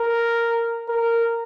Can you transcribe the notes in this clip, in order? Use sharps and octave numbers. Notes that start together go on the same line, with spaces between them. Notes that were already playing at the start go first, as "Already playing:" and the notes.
Already playing: A#4
A#4